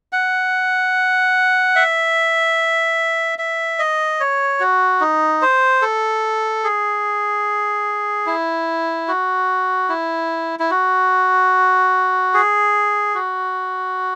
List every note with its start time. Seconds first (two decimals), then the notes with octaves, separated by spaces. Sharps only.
0.13 F#5
1.76 E5
3.39 E5
3.79 D#5
4.20 C#5
4.60 F#4
5.01 D#4
5.42 C5
5.82 A4
6.64 G#4
8.26 E4
9.08 F#4
9.89 E4
10.59 E4
10.71 F#4
12.34 G#4
13.15 F#4